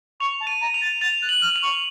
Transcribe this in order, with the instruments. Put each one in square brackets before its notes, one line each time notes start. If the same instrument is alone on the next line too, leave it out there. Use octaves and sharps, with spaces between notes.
[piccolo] C#6 [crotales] F7
[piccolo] A5
[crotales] D#7
[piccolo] A#5
[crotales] F7
[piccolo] A6
[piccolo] A6 [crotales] F7
[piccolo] F#6
[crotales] F#7
[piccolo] F6
[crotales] F7
[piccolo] C#6